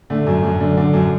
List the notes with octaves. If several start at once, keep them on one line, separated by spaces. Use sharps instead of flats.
D3 A3
F#2
F#2
D3
D3
F#2